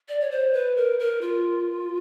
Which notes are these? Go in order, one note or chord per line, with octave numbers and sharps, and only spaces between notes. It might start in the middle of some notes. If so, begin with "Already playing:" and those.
D5
C#5
C5
B4
A#4
A#4
F4